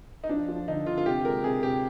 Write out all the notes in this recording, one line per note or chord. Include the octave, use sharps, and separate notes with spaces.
D#4
F3 D4
F3
D3 D#4
D3 F4
F4
C3 G4
G#3 A#4
C3 G#4
C3 G4